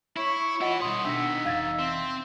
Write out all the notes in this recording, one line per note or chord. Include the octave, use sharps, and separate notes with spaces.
E4 C#5
E3 E4 F4 D#5 F#5
B2 D#3 G3 F#5 C6 D#6
B2 D4 E5 A#6
F1 E3 F5 G#6 A6
C4